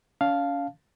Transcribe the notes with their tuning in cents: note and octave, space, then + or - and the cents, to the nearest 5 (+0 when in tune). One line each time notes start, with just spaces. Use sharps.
C#4 +35 F5 +0 A5 -5